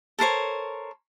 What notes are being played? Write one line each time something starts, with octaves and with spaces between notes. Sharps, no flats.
A4 A#4 C5 C#5